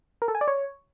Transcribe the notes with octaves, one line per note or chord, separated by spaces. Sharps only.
A#4
A4
G#5
D5
C#5